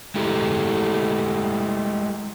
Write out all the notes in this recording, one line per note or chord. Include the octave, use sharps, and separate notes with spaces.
G#3 A3 E4 G4